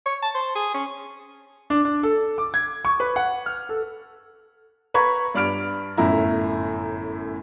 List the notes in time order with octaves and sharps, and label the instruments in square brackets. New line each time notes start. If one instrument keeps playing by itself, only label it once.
[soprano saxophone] C#5
A5
C5
G#4
C#4
[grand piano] D4
D4
A4
D6
G#6
C#6
B4
F#5
F6
A4
[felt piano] B4 A#5 B5 C#6 G#6
G2 D5 B5 F6 D7
G1 F#2 A2 E4 A#5